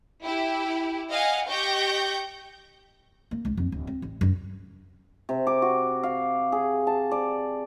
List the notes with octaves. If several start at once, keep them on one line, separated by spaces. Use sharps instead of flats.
E4 G4
D#5 F5 F#5 G#5
G4 D#5 C#6 G6 A#6
A#3
C#2
F2
D1
C4
A1
F#2
C3
D6
F#4
F5
G#4
A5
D5